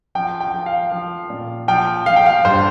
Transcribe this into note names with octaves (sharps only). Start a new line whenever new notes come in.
F3 G5
G5
F3
F5
F3
A#2
F3 G5
F3 F5
G5
F5
G2 C5